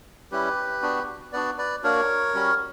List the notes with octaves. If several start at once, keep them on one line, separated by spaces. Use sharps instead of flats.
G3 C#4 E4 G4 B4
B3 D4 F#4
B3 D4 F#4 B4 D5
B4 D5
A#3 D4 F#4 A#4 C#5
G3 C#4 F#4